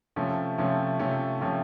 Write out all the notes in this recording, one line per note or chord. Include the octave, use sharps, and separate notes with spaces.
C3 F3 A3 C#4
C3 F3 A3 C#4
C3 F3 A3 C#4
C3 F3 A3 C#4